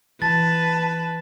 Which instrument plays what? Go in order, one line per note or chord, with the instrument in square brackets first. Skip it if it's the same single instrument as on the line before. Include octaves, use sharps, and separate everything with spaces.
[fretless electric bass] E3 [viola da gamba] B4 [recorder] A5 [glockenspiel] A6